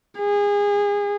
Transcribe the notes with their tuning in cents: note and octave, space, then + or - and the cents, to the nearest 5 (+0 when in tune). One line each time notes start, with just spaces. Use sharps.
G#4 -30